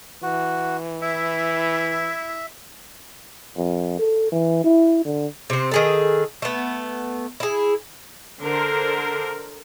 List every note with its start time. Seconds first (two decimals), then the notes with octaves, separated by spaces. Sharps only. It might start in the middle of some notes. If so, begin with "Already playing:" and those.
0.23 E3 F#4
1.02 E4 E5
3.57 F2
3.99 A4
4.32 E3
4.64 E4
5.05 D3
5.50 C3 C4
5.71 D#3 G#4 A4
6.42 A3 B3
7.40 E4 G#4
8.43 D3 A#4 C5